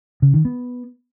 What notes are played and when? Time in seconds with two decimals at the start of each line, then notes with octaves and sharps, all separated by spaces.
0.22 C#3
0.34 D#3
0.45 B3